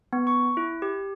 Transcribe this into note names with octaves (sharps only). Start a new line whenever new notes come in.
B3
C#6
E4
G4